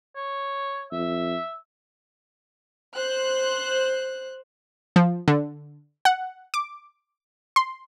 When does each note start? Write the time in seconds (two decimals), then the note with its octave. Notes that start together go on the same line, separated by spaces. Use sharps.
0.16 C#5
0.92 F2 E5
2.96 C5 F#6
4.96 F3
5.28 D3
6.05 F#5
6.54 D6
7.56 C6